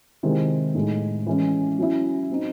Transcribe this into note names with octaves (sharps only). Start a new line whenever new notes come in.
C3 D#3 G#3 C4 E4
A2 G#3 D#4
E3 G#3 C#4 E4
F#3 C#4 E4
F#3 C4 D#4